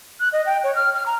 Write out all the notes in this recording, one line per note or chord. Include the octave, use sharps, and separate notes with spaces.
F#6
D#5
G5
C#5
F6
F6
A#5